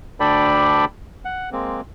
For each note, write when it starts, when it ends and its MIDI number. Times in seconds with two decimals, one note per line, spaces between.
0.20 0.85 38
0.20 0.85 62
0.20 0.85 69
0.20 0.85 74
0.20 0.85 79
0.20 0.85 83
1.25 1.50 78
1.52 1.81 56
1.52 1.81 58
1.52 1.81 60